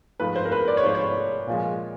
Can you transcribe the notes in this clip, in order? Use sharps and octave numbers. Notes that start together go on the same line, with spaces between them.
G#2 F3 A3 B4
C5
A#4
B4
D5
C#5
G#2 F3 A3 C5
C#5
A#2 F3 G#3